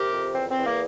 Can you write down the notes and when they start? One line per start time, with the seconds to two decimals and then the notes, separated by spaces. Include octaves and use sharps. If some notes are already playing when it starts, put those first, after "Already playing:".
Already playing: C3 G4 A#4
0.13 F2
0.35 E2 C4
0.50 C4
0.59 E2
0.65 A#3